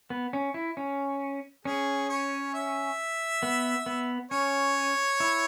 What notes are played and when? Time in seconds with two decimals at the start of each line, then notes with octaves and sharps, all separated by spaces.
0.10 B3
0.33 C#4
0.54 E4
0.77 C#4
1.65 C#4 G#4
2.10 C#5
2.54 E5
3.43 B3
3.86 B3
4.31 C#4 C#5
5.20 E4